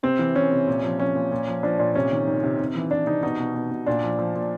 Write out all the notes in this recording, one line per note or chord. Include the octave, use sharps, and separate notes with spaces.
C3 C4
E3
E3 C#4
C3
A#2
F3
F3 C#4
A#2
A#2
F3
F3 D4
A#2 D4
C3 C#4
D#3
D#3
C3
C3
E3
E3 D4
C3 D#4
B2 D#4
B2
B2
B2
A#2 D4
F3
F3
A#2